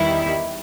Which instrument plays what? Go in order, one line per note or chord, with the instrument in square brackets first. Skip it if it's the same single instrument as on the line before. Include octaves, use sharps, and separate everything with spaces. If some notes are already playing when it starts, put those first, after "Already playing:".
Already playing: [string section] E2 D#3 G3 E4